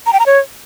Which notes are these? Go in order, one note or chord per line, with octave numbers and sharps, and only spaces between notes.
A#5
G5
A#5
C#5